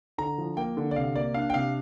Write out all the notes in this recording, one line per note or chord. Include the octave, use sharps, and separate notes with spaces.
D3 A#5
F3
A#3 G5
D3
D5
C3 F5
A#3 D5
D4 F5
G5
C3 F5